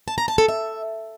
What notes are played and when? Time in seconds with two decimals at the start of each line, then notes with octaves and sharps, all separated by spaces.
0.08 A5
0.18 A#5
0.28 A5
0.38 A4
0.48 E5